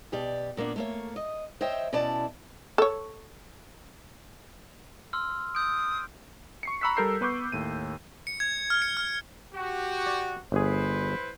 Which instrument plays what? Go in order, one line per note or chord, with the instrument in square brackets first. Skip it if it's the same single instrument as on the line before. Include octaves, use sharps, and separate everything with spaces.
[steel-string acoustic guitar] B2 G4 D5
A#2 A#3 B3 D4
A3 A#3 C#5
D#5
C5 C#5 D#5 E5 G5
B2 C#4 E4 D5 A5
[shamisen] A4 C#5
[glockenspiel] C6 E6 F6
[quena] D#6 [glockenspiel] G6 D7
[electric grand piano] C#6 C7 C#7
A#5 B5 C#6 E6 F#6 B6
G3 A4 A#4 G6 C7
B3 B4 C#6 D6 G6
D#2 A2 D#7
[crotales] C#7
G#6
F6
C#7
F6
[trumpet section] F#4 G4
[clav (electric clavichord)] D5
[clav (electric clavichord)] G1 G#4 [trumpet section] E4 B4 C5